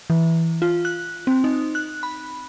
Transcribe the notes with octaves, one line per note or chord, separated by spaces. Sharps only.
E3
F4
F#6
C4
D#4
F#6
B5